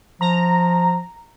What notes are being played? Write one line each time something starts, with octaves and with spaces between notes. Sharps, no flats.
F3 A#5